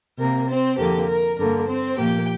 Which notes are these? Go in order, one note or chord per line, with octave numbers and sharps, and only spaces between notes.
C3 A#3 A#4
C4 C5
F2 D3 A#3 G4
A#4
G2 D3 A#3 A#4
C4 C5
A#2 F3 A#3 G4 G5